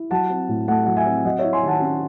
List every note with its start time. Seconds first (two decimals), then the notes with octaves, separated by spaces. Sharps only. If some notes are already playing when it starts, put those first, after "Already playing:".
Already playing: E4
0.11 F#3 F#5 A5
0.30 C4
0.49 A2
0.68 A3 F#5 A5
0.86 F#3 F#5
0.96 E5 G#5
1.06 C4
1.25 F#3 D#5 F#5
1.39 E4 C#5 E5
1.53 G#5 C6
1.63 D#3 F#5 A5
1.81 C#4